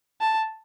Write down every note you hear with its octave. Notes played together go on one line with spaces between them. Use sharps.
A5